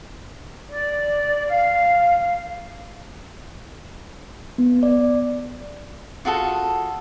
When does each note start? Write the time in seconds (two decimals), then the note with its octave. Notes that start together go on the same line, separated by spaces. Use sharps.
0.70 D5
1.47 F5
4.58 B3
4.83 D5
6.25 F4 F#4 G#4 A4